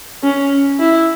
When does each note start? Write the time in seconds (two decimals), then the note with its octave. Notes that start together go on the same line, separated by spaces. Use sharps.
0.23 C#4
0.79 E4